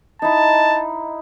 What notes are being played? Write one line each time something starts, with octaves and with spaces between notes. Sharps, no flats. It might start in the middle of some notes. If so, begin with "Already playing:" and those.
D#4 E4 A5